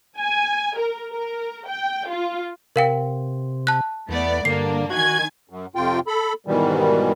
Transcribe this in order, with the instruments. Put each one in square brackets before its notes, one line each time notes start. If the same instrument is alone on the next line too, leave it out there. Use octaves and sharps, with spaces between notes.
[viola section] G#5
A#4
A#4
G5
F4
[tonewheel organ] C3 [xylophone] A#4 F5 G5
[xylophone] A5 F#6
[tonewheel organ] E2 [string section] A3 B3 D5
[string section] G2 A#3 D4 [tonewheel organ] D3 [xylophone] C7
[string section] D#3 G#5 G#6 [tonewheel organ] F#4
[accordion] F#2
F2 C3 F4 G5
A4 B5
G#2 B2 D#3 E3 G3